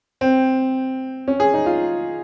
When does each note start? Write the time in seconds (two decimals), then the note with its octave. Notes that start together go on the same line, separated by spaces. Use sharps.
0.21 C4
1.28 C#4
1.40 G#4
1.54 D#4
1.66 F4